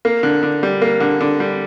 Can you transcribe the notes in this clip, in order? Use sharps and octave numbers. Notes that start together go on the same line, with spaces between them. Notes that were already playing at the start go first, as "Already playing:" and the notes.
A#3
D3
D3
G3
A#3
D3
D3
G3